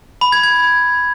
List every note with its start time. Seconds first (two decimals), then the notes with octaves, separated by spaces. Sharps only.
0.21 B5
0.32 G#6
0.43 G#6